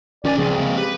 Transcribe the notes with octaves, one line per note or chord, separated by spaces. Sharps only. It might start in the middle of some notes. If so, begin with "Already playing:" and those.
D#3 C#4 D5 G#5
C#2 C#3 F3 C4 G#4
G#3 A#3
G4 B4